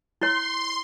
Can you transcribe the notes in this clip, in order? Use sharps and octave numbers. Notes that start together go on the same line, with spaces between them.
E4 C#5 C6